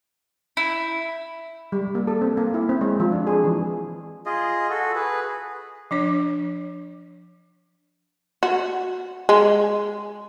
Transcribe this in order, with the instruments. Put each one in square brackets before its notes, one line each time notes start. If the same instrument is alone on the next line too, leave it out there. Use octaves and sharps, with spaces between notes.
[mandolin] E4
[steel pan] G3
A#3
A4
C4
A#3
E4
C4
G#3
F3
D4
G#4
E3
[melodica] F4 G#4 D#5
F#4 A4
G#4 B4
[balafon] F3 D4 C#5
[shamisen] F#4
G#3